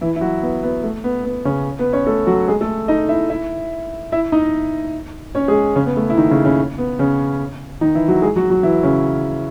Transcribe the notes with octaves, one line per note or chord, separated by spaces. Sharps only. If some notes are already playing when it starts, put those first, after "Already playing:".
E3 E4
E4
F#3 F#4
B3
B3
A3
B3
B3
C#3 C#4
B3 B4
C#4 C#5
A3 A4
F#3 F#4
G#3 G#4
A3 A4
D#4 D#5
E4 E5
E4 E5
E4 E5
D#4 D#5
C#4 C#5
G#3 G#4
C#3 C#4
B3
A3
E4
D#3 D#4
C#3 C#4
C#3 C#4
B3
C#3 C#4
D#3 D#4
E3 E4
F#3 F#4
G#3 G#4
F#3 F#4
F#3 F#4
E3 E4
C#3 C#4